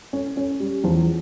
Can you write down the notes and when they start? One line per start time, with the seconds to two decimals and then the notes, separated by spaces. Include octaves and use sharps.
0.13 C#4
0.37 C#4
0.60 G3
0.84 E2 F3